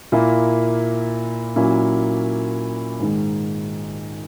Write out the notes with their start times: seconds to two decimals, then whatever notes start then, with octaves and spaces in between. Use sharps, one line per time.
0.12 A#2 A#3 E4
1.56 A#2 F#3 A#3 C#4 E4
3.00 G#2 D#3 G#3